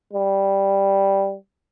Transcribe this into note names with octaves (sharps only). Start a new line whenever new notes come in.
G3